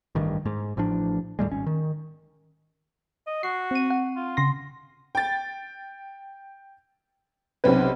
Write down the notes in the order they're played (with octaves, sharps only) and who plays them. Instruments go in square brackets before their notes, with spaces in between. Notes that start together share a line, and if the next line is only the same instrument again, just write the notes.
[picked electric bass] A1 G2 D#3
G#2
A1 A2 F3 D4
D#2 A2 G3 G#3
G#1 C#4
D#3
[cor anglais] D#5
[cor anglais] F#4 [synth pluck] C7
[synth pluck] C4 D#7
F#5
[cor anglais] F4
[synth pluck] C#3 C6 A#6
[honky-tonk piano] G5 A6
B1 C3 C4 C#4 B4